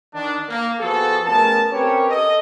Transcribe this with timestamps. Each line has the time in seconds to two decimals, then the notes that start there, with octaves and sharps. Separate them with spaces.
0.14 D#3 D4
0.49 A#3
0.80 F3 B3 F#4 G#4 A4
1.26 A3 B3 C#4 G#4 A#4 A5
1.72 C4 C#4 G4 A#4 B4 C#5
2.09 A4 D#5